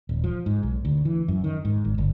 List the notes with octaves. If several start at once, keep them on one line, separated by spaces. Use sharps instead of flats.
D#1
F3
G#2
B1
D2
E3
F#2
D#3
G#2
G#1
G1